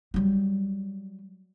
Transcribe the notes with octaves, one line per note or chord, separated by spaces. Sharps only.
F#3 G3